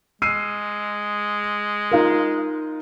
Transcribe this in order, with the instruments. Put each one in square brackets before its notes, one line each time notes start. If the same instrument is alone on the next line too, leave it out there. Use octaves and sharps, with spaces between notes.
[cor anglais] G#3 [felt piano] E6 C7 D#7
[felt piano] D#4 F4 A#4